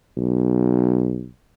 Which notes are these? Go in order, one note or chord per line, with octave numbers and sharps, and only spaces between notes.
B1